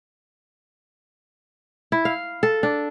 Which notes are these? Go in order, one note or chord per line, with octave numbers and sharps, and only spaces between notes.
E4
F5
A4
D4